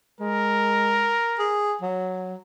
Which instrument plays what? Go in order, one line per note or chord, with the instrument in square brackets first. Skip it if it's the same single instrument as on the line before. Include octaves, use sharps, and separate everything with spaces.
[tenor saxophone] G#3 [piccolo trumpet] A#4
[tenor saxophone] G#4
F#3